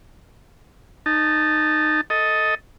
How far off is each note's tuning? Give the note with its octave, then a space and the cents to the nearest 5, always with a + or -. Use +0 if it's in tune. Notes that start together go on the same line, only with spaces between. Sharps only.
D#4 -20 A5 +0
A4 +0 D#5 +10